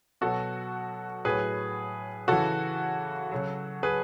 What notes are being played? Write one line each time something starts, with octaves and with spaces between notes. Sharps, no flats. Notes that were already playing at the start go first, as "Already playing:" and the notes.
B2 F#3 F#4 A4
A2 F#3 G#4 B4
C#3 E3 F#4 A4
C#3 F#3
G#4 B4